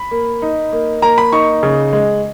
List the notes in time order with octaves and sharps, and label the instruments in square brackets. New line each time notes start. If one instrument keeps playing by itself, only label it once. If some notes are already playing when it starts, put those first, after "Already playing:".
Already playing: [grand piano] B5
A#3
D#4
A#3
A#3 A#5
B5
D#4 C#6
C#3
G#3